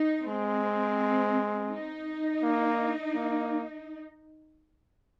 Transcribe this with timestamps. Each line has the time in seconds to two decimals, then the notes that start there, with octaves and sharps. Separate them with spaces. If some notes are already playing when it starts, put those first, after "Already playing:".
Already playing: D#4
0.27 G#3 C4
1.72 D#4
2.43 A#3
3.15 A#3